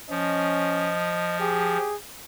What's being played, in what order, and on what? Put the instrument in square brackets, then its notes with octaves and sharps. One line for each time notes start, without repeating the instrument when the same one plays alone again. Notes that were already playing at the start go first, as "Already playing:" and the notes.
[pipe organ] F3 [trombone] C#4 [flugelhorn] D#5
[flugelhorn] G4 [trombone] G#4